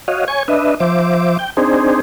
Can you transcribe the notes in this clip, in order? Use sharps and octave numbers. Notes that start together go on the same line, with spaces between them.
F#4 C#5 D#5 F5
C#5 G#5 C#6
D4 B4 D#5 E5
F3 C5 E5 D6
G5
C4 D4 D#4 G#4 C5